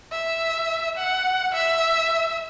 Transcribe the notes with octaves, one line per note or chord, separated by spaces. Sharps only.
E5
F#5
E5